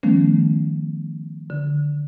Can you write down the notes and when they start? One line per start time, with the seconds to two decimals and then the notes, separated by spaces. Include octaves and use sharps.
0.03 D#3 F3 G3 A3 B3 C#4
1.50 D3